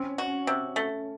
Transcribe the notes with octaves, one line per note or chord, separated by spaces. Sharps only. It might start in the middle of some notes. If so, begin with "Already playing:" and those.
Already playing: C4 C#4
F#4
C3
A3